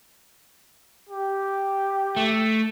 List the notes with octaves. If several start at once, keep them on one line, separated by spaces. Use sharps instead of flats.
G4
A3